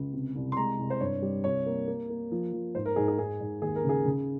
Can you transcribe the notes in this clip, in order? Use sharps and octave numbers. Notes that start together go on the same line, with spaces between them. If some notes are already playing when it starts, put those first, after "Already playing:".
Already playing: C#2
C3
C2
C6
G#3 A#5
C2
C5
G2 C#5
G3
C2 C#5
A#3
A#3
A#3
F3
F3
G#2 C5
A#4
G#2 G#4
G#4
G#2 G#4
G#2
D#2 G#4
A#4
C#3 G#4
C#3